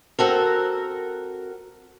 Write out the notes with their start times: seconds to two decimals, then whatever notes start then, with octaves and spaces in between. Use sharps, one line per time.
0.19 C4 F#4 A4 A#4